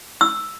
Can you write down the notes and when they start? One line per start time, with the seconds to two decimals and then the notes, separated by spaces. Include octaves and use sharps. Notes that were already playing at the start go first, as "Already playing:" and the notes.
0.21 E6